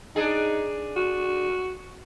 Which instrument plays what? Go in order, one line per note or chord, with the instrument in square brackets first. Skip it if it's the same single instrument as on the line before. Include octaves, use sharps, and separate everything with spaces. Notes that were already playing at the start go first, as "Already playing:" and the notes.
[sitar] D4 G#4 [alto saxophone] D#4
[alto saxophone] F#4